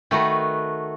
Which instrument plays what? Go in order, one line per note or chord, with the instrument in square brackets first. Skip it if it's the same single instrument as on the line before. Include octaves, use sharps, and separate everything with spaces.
[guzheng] D#3 A3 F#4 B4